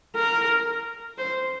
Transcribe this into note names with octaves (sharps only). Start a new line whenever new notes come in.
A#4
C5